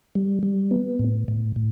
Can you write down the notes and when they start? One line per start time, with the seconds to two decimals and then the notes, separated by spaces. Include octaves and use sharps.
0.15 G3
0.43 G3
0.71 B3
0.99 A2
1.28 A2
1.56 A2